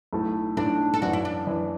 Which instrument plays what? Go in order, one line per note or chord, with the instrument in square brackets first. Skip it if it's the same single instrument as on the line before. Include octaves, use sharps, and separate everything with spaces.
[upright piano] B1 A2 A3 E4 A4
[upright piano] B1 A2 A3 E4 A4 [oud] D4
[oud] A4
[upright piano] F#2 E3 D4 [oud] F#4
[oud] E4
D4
[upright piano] F#2 E3 D4